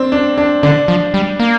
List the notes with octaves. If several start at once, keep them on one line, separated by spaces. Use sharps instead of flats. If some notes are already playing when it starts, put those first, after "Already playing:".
Already playing: C4 D4
D4
D4
D3 D4
F3
G3
A#3